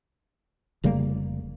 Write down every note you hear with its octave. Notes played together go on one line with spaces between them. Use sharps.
F1 C#3 G3 A#3